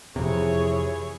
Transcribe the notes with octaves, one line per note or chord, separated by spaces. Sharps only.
F2 C3 E3 G#4 C#5